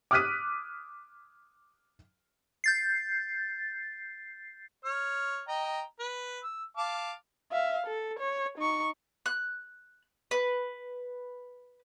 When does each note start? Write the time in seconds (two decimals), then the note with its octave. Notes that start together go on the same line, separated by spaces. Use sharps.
0.11 D6 D#6 F6 F#6 B6 D#7
2.64 G6 A6 C7
4.85 C#5 F6
5.48 D#5 G5 A#5
5.99 B4
6.43 E6
6.77 F5 A5 D6
7.51 E5 F5
7.86 A4
8.19 C#5
8.58 D#4 C#6
9.26 F#6
10.31 B4